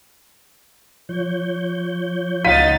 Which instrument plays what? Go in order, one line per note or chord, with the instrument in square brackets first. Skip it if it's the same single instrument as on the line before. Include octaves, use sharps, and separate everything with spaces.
[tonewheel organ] F3 C#5 G6
[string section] C#2 D#4 A6 [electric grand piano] F5 F#5 [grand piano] B6 D#7